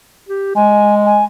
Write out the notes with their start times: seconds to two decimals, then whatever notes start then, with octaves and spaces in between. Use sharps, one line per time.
0.29 G4
0.55 G#3 G#5
1.05 G#5